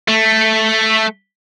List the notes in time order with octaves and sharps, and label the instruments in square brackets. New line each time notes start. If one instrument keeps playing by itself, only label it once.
[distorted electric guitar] A3